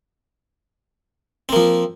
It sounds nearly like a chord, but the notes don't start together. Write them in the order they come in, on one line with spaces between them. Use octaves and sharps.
C4 A#3 F3